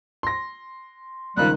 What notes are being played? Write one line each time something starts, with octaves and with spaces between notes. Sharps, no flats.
C6 A#6
C#2 D#3 F3 G3 F#6